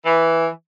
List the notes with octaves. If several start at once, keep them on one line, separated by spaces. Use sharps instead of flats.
E3